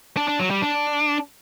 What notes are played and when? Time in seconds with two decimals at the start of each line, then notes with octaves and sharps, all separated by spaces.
0.17 D4
0.28 D4
0.39 F#3
0.51 G3
0.62 D4